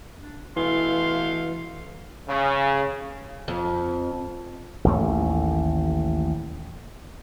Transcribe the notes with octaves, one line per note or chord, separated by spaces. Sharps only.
D4
B2 E3 A3 F5 C6
C#3
F2
A1 D#2 A3